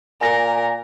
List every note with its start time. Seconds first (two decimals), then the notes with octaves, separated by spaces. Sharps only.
0.21 A#2 A#4 G#5 A#6